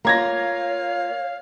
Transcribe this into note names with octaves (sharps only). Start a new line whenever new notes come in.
A#3 F4 C#5 F5 A#5 G#6 A#6